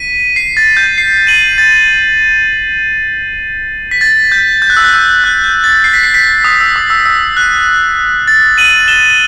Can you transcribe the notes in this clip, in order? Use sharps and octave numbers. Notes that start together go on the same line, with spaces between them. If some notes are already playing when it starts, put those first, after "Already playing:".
Already playing: B6 D#7
C7
A6
G6
C7
D#7 F#7
A6
B6
A6
G6
G6
F#6
E6
F#6
E6
F#6
G6
A6
C7
B6
C7
B6
D#6
E6
D#6
E6
E6
F#6
A6
D#7 F#7
E7 G7